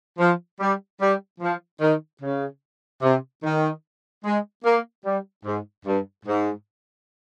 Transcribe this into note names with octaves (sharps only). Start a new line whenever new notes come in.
F3
G3
G3
F3
D#3
C#3
C3
D#3
G#3
A#3
G3
G#2
G2
G#2